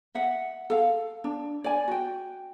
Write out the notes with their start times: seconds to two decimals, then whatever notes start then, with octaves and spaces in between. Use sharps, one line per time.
0.15 D#5 E5 F#5
0.70 A4 F5
1.24 D4
1.64 D5 G#5
1.88 F#4 G5